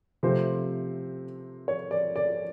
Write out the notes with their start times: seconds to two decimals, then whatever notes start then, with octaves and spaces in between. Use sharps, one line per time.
0.23 C3 F3 A3 C4 C5
1.68 C#5
1.91 D5
2.16 D5